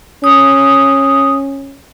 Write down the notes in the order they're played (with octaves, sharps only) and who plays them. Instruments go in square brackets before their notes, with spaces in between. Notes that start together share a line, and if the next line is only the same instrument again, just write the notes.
[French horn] C#4 [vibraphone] D#6